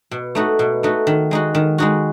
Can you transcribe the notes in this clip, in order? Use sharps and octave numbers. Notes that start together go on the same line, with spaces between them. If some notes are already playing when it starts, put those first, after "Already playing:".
B2
A3 D#4 F#4
B2
A3 D#4 F#4
D#3
G#3 D#4 F#4
D#3
G#3 D#4 F#4